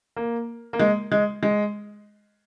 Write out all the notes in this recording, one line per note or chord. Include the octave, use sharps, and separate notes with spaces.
A#3
A#3
G#3
G#3
G#3